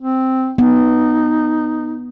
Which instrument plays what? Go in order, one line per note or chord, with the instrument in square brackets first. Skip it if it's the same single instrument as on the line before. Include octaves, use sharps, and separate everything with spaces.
[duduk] C4
[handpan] B3 [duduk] D#4